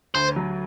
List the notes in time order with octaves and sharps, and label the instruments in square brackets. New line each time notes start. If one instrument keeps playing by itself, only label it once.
[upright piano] D2 [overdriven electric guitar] C5
[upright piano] F#3